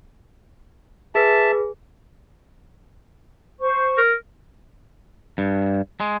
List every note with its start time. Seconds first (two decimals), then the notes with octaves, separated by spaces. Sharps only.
1.15 G#4 B4 E5 A5
3.59 C5 C#6
3.98 A#4
5.38 G2
6.00 G#3